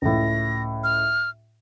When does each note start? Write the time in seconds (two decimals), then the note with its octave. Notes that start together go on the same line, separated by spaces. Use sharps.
0.02 C#2 A2 A#6
0.84 F6